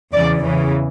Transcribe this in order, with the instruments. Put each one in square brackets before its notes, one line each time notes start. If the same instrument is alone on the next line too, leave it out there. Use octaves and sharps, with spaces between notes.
[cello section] E2 C#3 E3 D5
E2 C#3 E3